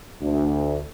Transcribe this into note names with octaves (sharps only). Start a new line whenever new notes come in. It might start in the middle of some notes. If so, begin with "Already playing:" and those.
D2